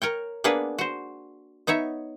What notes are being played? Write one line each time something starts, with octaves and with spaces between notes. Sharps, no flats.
A#4 C#5 G5
A#3 B3 D4 G#4 B4
F#4 C5
B3 D#4 C#5 E5